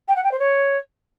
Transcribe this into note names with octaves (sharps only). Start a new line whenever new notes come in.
G5
F#5
G5
C5
C#5